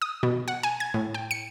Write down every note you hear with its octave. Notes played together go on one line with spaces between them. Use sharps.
D#6
B2
F#5
G#5
G#6
A2
G5
C#7